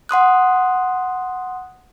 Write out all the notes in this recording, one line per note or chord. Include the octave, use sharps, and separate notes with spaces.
F#5 C6 D#6 F#6